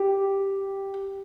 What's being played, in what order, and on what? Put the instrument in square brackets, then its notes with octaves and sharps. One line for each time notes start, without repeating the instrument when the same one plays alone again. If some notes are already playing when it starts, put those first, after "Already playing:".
Already playing: [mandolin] G4